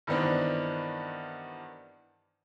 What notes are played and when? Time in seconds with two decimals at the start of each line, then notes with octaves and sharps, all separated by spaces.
0.07 G2 D#3 E3 B3 C4 D4